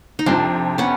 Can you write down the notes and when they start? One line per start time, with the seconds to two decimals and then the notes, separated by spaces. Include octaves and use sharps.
0.19 D#4
0.26 F2 C3 F3 C4 D4
0.78 B3 C#4